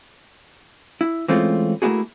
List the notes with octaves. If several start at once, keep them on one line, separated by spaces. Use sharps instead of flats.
E4
E3 G#3 A3 C4 C#4 F4
A3 A#3 D4 E4 F#4 G#4